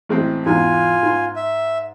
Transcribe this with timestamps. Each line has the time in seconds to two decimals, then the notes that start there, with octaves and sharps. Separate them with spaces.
0.09 A1 G#3 C4
0.46 E2 G#2 F4 G#5
1.03 G#2 C6
1.36 E5